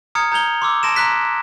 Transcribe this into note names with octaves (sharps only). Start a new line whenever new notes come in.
A#5 D#6 F6 G#6 C#7
A#5 G6 G#6 F7 G7
C6 D6 E6
A5 C6 A#6 D7 E7
A#5 C6 F#6 B6